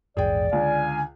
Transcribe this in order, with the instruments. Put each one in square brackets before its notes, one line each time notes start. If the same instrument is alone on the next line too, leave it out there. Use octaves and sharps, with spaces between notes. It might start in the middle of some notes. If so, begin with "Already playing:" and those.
[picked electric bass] A#1 E2 G#2 [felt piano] G#4 G5 [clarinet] D5
[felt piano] C#2 [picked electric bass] D3 [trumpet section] F5 G#5